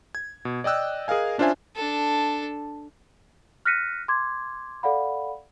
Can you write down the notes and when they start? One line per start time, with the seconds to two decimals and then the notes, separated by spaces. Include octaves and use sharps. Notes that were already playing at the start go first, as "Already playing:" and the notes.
0.15 G#6
0.45 B2
0.64 D5 D#5 G5 E6 F#6
1.08 G#4 A#4 D#5 F5 G#5
1.38 C#4 D4 F4 C5 E5 G#5
1.76 D4 A4
3.65 F6 F#6 A#6 B6 C#7 D#7
4.08 C6 D6 G#6
4.83 A4 D5 F5 F#5 B5